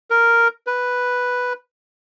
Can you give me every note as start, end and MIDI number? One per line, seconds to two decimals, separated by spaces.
0.10 0.48 70
0.67 1.53 71